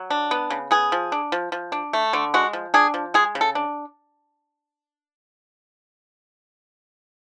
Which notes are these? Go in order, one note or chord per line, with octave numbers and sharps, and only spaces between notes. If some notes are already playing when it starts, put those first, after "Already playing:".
Already playing: F#3
D4
B3
C#3
B3 G#4
F3
D4
F3
F3
D4
A3
D3
G#3 F#4
F3
D4 G#4
F3
G#3 G#4
C#3
A4
D4